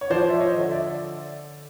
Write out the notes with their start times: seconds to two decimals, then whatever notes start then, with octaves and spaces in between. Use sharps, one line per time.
0.01 C#5
0.10 F3 C5 D5
0.29 E5
0.40 C#5 D#5
0.56 D3
0.71 D5 E5